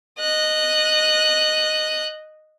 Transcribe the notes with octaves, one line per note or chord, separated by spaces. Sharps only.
D#5 F#6